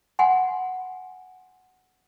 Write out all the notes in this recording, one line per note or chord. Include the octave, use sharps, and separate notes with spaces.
F#5 G#5 B5 C6